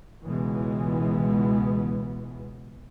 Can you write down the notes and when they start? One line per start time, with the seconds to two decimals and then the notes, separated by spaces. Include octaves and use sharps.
0.26 C#2 B2 E3 G#3 B3